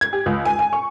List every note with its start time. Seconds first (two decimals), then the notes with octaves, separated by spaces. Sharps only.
0.01 G#6
0.13 G4
0.26 C#2
0.45 G#5
0.59 G#5
0.73 C#6